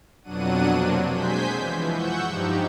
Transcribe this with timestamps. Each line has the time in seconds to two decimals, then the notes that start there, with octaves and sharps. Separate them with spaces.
0.23 F2 B2 F#3 D4 F#5 D#7
0.71 C3 F#3 A#3 C4 D4
1.08 G#3 C5 G#5 G6 B6
1.54 E3 F3
1.90 F#5 C#6 E6 G6
2.28 G2 F3 D#4 G4